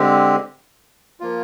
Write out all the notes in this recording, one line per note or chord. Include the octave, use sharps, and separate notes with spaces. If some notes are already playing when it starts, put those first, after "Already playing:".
Already playing: D3 G#3 C4 G4
F3 A#3 F4